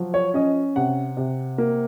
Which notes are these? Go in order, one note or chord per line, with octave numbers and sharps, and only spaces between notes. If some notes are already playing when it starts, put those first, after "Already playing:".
Already playing: F3 F#3
C#5
C#4 D#5
C3 F#5
C3
A#3